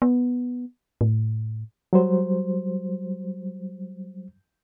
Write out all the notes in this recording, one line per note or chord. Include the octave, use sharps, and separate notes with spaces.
B3
A2
F#3 G3 C5